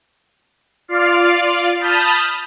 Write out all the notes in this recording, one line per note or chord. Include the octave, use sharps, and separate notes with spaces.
F4 D5 F5
A5 B5 D#6 F6 G6